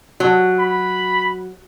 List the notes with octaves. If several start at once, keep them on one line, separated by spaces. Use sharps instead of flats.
F#3
B5